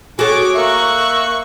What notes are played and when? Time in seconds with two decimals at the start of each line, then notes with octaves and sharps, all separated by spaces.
0.19 F#4 G#4 A4 C#5 D6
0.55 A#3 E5 C#6 F#6